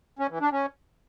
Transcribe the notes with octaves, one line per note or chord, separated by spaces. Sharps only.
C#4
E3
D4
C#4